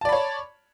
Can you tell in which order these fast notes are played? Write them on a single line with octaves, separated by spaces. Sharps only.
A5 D5 B5 C#5